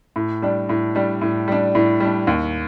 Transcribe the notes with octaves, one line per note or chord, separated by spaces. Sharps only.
A2
G3 D4
A2
G3 D4
A2
G3 D4
A2
G3 D4
D#2